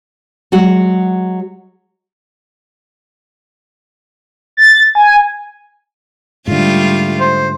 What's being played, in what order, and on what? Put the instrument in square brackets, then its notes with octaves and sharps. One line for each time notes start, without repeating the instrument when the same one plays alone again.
[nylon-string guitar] F#3 G#3 F#4
[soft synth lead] A6
G#5
[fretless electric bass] G#2 D3 [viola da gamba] G3 A3 F4
[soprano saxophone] C5